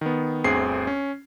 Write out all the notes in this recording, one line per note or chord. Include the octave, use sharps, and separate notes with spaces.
D#3 B3
G1 D2 C4 G#4 C7
C#4